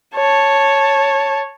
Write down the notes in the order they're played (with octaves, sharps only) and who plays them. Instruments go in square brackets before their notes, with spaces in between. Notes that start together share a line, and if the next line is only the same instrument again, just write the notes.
[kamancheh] C#5 A5